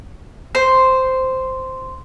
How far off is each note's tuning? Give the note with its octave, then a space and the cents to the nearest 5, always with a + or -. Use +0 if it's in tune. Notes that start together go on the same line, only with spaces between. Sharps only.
C5 -5